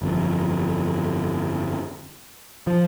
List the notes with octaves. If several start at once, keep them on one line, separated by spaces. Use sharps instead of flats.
G1 F2
F3